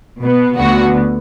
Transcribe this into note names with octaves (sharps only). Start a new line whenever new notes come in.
B2 B3
D2 D3 B3 F#4